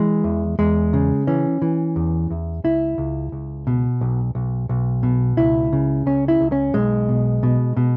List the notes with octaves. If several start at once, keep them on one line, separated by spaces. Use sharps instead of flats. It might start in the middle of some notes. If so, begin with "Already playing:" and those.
Already playing: E3 G#3
E2
E2 G#3
C#3
E3 C#4
E3
E2
E2
C#2 E4
C#2
C#2
B2
B1
B1
B1
B2
C#2 E4
C#3
C#2 C#4
E4
C#2
C#4
B1 G#3
B2
B2
B2